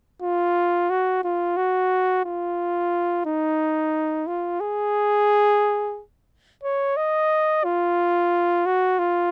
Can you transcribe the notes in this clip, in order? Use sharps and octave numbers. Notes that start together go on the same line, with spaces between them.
F4
F#4
F4
F#4
F4
D#4
F4
G#4
C#5
D#5
F4
F#4
F4